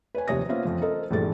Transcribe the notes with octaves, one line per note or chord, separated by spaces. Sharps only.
B4 C#5 G#5
D#2 C3 F3 C#5 D#6 A#6
A#3 B3 C#4 F4 C5 E5
F2 F3
A4 A#4 C5 D#5
A#1 G2 E3 G#3 A4 A6